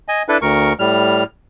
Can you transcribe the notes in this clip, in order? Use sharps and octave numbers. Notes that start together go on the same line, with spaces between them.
D#5 G#5
D4 E4 A4 B4
D2 A#4 C#6
A2 G3 F6